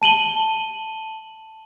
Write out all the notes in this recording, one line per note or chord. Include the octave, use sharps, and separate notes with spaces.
A5 D#7 F#7 G7